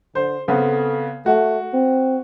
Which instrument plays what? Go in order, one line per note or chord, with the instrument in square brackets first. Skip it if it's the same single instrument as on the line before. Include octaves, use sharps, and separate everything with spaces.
[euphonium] D3 [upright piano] C5
[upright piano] C#3 B3 C4 [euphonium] A4
[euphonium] A3 [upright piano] F#4
[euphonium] C4